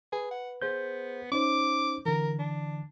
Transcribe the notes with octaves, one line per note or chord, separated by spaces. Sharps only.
G#4 B4
F#5
B3 G#4 C5 G6
C#4 D#4 C5 D6
D3 E3 A#4
D4